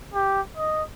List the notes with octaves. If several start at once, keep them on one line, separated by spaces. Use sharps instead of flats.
G4
D#5